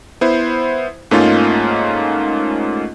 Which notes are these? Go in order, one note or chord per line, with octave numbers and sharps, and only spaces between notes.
B3 E4 C5
G#2 A3 A#3 C#4 D#4 F4